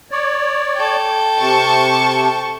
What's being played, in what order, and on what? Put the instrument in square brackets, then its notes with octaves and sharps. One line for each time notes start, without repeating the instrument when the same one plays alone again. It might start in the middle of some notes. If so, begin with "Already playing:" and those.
[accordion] C#5 D5
[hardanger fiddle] A4 G5
[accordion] C3 [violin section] A5 C#6